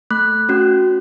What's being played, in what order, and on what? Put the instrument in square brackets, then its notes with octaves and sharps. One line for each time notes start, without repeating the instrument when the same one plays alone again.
[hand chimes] A3 F#6
C#4 F#4